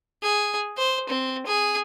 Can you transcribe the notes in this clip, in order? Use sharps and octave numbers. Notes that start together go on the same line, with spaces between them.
G#4
C5
C4
G#4